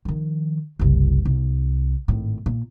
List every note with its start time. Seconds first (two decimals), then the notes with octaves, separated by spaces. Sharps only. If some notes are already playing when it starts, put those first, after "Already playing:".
0.05 D#3 F3
0.79 F#1 C2
1.25 C2
2.08 G#1 A2
2.46 A#2